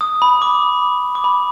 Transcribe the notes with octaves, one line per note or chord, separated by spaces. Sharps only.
D#6
B5
D6
D6
B5